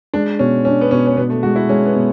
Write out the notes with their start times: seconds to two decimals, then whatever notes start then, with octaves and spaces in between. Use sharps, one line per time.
0.14 G#3 D4
0.39 B2 C#4
0.65 C#4 D4
0.81 B3
0.91 B2 C#4
1.07 C#4
1.17 B2 B3
1.30 A3
1.43 G#3 F#4
1.56 E4
1.69 G#3 C#4
1.86 B3
1.96 B2